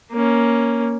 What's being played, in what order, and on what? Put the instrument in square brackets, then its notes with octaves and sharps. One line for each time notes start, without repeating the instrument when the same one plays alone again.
[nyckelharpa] A#3 C#4